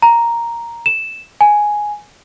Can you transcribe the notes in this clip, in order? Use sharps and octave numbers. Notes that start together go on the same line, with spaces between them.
A#5
E7
G#5